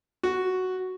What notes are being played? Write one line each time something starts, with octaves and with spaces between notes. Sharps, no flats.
F#4